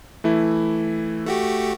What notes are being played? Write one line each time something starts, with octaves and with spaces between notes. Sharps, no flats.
E3 A3 E4
A3 F#4 G4